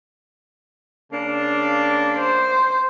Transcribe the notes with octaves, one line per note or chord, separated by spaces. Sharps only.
C#3 A#3 D4
C5